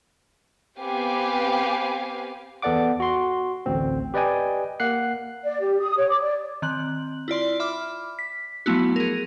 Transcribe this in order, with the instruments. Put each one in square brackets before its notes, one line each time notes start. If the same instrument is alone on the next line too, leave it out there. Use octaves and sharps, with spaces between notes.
[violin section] B3 C4 G4 B4 F5 G#5
[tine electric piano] E2 B3 A4 D5 F#5 D6
F#4 C6
A1 D2 C4
G4 B4 D5 D#5 G5 G#5
A#3 F#5 F#6 C7
[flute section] D5
G4
D#6
C#5
D6
D5
[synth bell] D#3 C4 F#6 F#7
E4 F4 D5 C6
E5 B5 D6 F6
B6
F3 F#3 A3 B3 E4 F#4
G#4 A#4